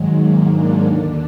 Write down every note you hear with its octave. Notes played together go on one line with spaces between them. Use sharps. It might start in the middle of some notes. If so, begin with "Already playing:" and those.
Already playing: G#2 D#3 F#3 G#3
A#3
D4
D#2 D3